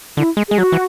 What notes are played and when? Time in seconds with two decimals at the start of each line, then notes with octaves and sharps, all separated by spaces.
0.17 D3 E4
0.37 G#3
0.48 G#3 G#4
0.58 F#3 F#4
0.72 E3